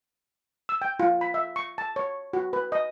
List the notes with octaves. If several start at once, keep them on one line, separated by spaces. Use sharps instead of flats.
E6
G5
F4
B5
E5
C#6
A5
C#5
F#4
B4
D#5